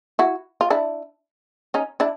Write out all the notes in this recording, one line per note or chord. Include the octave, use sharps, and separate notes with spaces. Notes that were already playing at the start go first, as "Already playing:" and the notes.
E4 F#4
F4
D4 E4
C#4 D#4
D4 E4